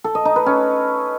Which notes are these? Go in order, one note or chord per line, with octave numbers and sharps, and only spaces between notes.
A4
D#5
D#4
B4
C#4